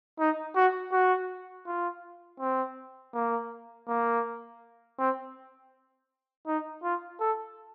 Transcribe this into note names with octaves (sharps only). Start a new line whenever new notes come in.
D#4
F#4
F#4
F4
C4
A#3
A#3
C4
D#4
F4
A4